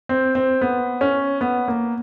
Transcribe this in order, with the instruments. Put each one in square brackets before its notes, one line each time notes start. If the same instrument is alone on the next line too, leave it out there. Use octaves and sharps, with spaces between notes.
[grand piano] C4
C4
B3
C#4
B3
A#3